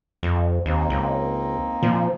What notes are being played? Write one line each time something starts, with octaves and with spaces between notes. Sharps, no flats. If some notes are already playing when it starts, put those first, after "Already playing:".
F2
D#2 A#3 C4 D#4
C#2
A#2 F3